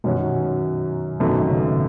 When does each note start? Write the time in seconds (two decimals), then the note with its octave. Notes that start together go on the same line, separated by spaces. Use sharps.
0.04 F#2 B2 D#3 F#3 C#4 F#4
1.20 G#1 F#2 B2 D#3 A3
1.50 C#3